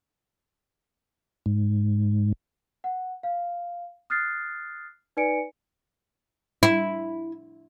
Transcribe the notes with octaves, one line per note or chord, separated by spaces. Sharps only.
G#2
F#5
F5
D#6 F6 F#6 A6 C7
D#4 B4 D5 G#5 C#7 D7
E4